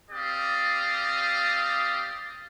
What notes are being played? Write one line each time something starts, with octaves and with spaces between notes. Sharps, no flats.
C4 G4 D5 F5 D#6